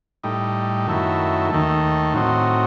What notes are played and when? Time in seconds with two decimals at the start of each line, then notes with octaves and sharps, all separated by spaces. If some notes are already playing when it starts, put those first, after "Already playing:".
0.23 A2 G3 D#4
0.87 F#2 D#3 A3 E4
1.50 D#2 D#3 A3
2.13 A2 F#3 C4 D#4